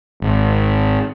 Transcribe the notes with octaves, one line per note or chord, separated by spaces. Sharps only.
G#1